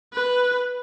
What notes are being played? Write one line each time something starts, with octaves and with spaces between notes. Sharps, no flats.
B4